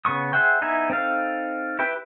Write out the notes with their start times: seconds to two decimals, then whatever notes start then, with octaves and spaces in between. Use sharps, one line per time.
0.05 C#3 B3 C#6 D#6
0.33 G#4 C5 E5 F#5 G5
0.62 B3 D#4 E4 E5 G#5
0.90 C4 D#4 A4 F5
1.79 E4 G4 B4 G5